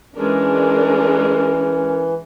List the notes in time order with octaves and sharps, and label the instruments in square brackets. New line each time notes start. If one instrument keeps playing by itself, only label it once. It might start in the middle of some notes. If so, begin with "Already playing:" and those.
[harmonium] E3 [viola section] G#3 D4 A#4 [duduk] C#4